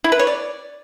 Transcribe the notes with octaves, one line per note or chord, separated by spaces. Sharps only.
E4
B4
C#5
D5